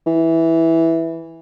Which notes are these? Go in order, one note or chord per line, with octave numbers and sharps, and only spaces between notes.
E3